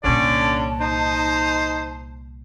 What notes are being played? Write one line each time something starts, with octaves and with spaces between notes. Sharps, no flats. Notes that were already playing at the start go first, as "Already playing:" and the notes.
C2 A#2 D3 C#4 D5 A5
D#4 C5